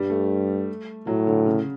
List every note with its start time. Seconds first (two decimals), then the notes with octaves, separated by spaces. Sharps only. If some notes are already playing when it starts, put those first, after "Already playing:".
Already playing: G2 G3
0.10 A3
1.07 A2 F#3
1.27 D3
1.46 C#3